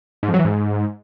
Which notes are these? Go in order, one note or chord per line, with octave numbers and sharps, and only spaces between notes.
G#2
F2
F#3
E3
G#2